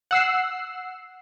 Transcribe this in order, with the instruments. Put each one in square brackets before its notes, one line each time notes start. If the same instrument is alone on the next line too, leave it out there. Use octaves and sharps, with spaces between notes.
[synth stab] F#5 E6 C7